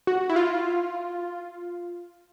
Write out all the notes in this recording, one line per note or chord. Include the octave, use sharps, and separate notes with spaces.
F#4
E4
F4